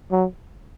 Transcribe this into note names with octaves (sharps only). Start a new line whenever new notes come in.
F#3